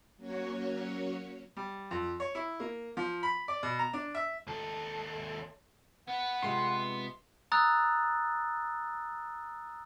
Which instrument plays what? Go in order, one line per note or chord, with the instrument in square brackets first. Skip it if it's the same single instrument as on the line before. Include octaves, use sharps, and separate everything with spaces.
[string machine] F#3 A#3 C#4 F#4 C#5
[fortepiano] G3
F2
C#5
E4
A#3
F3
B5
D5
B2
A#5
D4
E5
[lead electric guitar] D#2 A4
[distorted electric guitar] B3 B4 [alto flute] F#5
[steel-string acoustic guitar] C3 G#3 F4 [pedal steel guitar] C6
[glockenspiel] A#5 D#6 E6 F#6 A6